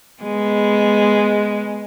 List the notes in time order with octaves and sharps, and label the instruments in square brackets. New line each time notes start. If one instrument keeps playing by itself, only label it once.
[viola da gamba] G#3 B3